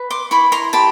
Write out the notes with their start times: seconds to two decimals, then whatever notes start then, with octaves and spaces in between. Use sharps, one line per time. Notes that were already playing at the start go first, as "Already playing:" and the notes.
Already playing: B4
0.10 C6 D6
0.31 E4 B5 C#6
0.52 A#5 C6
0.73 G4 A5 B5